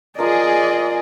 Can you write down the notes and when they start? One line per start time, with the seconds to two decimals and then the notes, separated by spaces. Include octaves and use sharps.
0.19 F3 G#4 A#4 D5 D#5